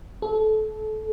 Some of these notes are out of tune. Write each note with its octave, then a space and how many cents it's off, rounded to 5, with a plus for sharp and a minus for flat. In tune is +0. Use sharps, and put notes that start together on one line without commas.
A4 -25